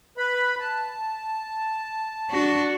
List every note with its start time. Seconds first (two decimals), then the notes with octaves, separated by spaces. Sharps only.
0.17 B4 B5
0.59 A5
2.30 D4 F#4